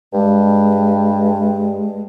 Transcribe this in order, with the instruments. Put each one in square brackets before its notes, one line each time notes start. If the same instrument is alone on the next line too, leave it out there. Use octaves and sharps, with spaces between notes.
[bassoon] G2 [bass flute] G#3